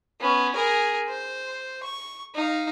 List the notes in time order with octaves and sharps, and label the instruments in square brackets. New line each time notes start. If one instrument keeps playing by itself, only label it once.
[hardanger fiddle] B3 C#4
G#4 A#4
C5
C#6
D#4 F5